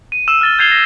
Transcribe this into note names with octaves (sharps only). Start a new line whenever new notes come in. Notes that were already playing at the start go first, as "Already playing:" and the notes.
D#7
E6 D#7 E7
F6 A6 G7
G6 G#6 C7 F7 G7
A#6